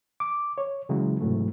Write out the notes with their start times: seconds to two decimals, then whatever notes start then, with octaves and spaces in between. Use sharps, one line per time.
0.20 D6
0.58 C#5
0.89 C#3 E3 F#3 G#3
1.21 G#2 C3 E3 F#3 A3